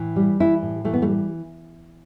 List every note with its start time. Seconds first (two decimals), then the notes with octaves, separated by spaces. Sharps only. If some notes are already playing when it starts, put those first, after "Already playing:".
Already playing: A2 E3
0.16 G3
0.40 E3 E4
0.62 A2
0.84 E3 A3
0.93 B3
1.02 A3
1.08 G3